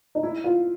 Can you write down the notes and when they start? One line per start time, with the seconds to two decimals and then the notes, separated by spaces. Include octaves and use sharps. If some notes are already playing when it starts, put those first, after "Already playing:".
0.15 D#4
0.23 E4
0.44 F4